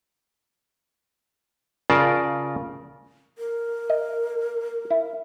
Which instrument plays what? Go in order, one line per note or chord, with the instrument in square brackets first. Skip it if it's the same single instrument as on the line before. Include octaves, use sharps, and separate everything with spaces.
[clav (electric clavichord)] C#3 F4 A#4 D5 A5
[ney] A#4
[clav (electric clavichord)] D#5
E4